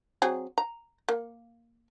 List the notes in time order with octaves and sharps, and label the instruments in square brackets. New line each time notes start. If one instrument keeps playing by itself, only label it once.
[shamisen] F#3 C4 G#4
A#5
A#3